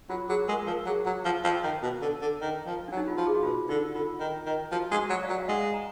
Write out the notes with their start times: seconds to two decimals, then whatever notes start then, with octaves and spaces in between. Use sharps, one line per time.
0.10 F#3 F4
0.29 F#3 G#4
0.48 G#3 A#4
0.67 F3 A#4
0.86 F#3 G#4
1.06 F#3
1.25 F3
1.44 F3
1.64 D#3
1.83 B2
2.02 D3
2.22 D3
2.41 D#3
2.67 F3
2.88 F#3 D4
2.97 D#4
3.08 F4
3.17 F3 F#4
3.27 G#4
3.35 F#4
3.43 B2 F4
3.69 D3 D#4
3.95 D3 F4
4.20 D#3
4.46 D#3
4.72 F3 F#4
4.91 G#3
4.98 F#4
5.10 F#3
5.23 D5 F5
5.30 F#3
5.40 F5
5.48 G#3 D#5 F#5
5.74 F#5 A#5